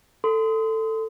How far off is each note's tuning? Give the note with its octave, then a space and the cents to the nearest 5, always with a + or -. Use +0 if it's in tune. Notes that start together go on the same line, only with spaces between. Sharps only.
A4 +10 C6 -30